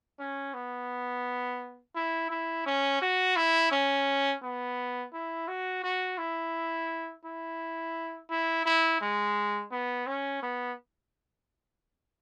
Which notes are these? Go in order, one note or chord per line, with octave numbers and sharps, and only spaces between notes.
C#4
B3
E4
E4
C#4
F#4
E4
C#4
B3
E4
F#4
F#4
E4
E4
E4
E4
G#3
B3
C#4
B3